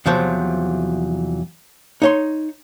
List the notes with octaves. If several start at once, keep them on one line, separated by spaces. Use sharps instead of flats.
E2 C3 F3 F#3 C5
D#4 C#5 C6